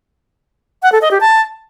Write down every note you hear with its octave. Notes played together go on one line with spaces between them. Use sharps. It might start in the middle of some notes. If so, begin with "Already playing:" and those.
F#5
A4
D#5
G4
A5